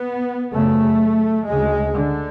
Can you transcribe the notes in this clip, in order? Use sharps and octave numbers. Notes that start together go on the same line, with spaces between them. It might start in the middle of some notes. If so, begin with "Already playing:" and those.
Already playing: B3
F#2 C#3 A3
D2 C#3 G#3
D3